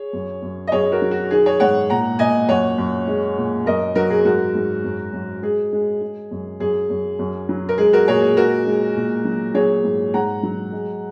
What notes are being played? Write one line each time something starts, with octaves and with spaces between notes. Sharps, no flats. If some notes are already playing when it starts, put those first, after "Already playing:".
Already playing: G#4 C#5
F#2
F#2
D#5
F#2 G#4 C#5
F#4 A#4
F#3
F#4
D#3 G#4
G#4 C#5
G#2 C#5 F#5
A#2 F#5 A#5
A#2 D#5 G#5
F#2 C#5 F#5
F#2
G#3
A#2
F#2 A#4 D#5
F#3 F#4 A#4
G#4
G#2 F#4 A#4
G#2
F#2
F#2
G#3 G#4
G#3
G#3
F#2
F#2 G#4
F#2
F#2
F#3
A#4
G#3 G#4
F#4 A#4
A#2 G#4 C#5
G#4
G#3 F#4 A#4
G#3
A#2
F#3
F#3 G#4 C#5
G#2
G#2 F#5 A#5
F#3
G#3